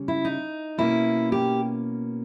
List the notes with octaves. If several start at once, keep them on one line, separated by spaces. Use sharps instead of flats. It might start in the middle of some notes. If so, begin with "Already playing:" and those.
Already playing: C#3 G3 C#4
E4
D#4
B2 A#3 C#4 E4
G4